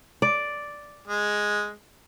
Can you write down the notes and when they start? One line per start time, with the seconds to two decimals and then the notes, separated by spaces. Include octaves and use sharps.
0.22 D5
1.07 G#3